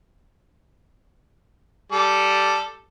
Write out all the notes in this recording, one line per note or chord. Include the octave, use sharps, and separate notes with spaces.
G3 A4 D6